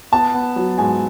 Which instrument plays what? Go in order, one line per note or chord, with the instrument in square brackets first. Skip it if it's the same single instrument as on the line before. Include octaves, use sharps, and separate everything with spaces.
[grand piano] B3 [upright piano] A5
[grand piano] B3
F#3
[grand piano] G#2 [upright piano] G#5